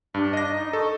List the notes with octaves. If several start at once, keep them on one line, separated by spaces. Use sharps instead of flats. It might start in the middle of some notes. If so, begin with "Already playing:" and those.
G2 D4
D#5 A#6
D#4
A4 C#6